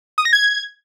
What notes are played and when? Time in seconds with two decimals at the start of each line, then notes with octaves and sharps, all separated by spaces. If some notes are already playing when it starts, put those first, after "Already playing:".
0.18 D#6
0.25 A#6
0.33 G#6